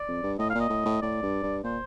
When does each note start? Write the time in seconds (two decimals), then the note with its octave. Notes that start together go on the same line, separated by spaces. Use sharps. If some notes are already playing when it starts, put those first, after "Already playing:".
Already playing: D5
0.08 F2
0.23 G2
0.39 A2 D#5
0.50 A#2 F5
0.60 D#5
0.70 A2
0.85 A2
1.02 A2 D5
1.23 G2
1.43 G2
1.64 A#2 C5